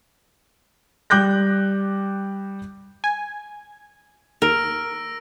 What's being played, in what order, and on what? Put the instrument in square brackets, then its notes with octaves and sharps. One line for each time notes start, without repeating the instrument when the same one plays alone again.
[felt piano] G3 G5 D6 F#6 G6 A#6
[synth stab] G#5
[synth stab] D#2 [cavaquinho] A#4 [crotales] E6 A#6 D7